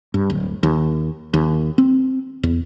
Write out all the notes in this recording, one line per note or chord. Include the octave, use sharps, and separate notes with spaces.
G2
D1
D#2
D#2
C4
E2